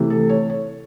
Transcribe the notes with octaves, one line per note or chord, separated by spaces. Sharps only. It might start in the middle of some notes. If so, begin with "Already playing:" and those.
Already playing: C3 E3 A3
A4
C#5
C#5